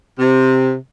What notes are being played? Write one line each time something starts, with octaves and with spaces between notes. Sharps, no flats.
C3